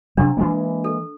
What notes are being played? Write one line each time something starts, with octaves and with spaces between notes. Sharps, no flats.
C3 F#3 D4
E3 G#3 A#3
A4